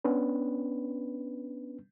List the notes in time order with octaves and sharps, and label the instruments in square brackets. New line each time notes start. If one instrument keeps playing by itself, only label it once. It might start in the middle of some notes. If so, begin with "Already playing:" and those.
[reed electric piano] B3 C#4 D4 B4